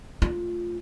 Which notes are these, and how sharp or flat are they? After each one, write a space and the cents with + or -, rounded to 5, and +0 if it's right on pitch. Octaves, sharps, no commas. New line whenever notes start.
A3 +0 F4 +0